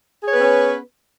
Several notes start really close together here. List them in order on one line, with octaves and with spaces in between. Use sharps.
G#4 C#5 B4 B3 C#4